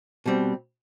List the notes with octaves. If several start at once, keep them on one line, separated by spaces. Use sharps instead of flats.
B2 G3 C4